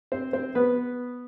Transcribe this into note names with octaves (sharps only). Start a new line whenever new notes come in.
C4 C5
C4 C5
B3 B4